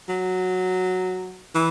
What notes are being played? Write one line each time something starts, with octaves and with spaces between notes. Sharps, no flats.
F#3
E3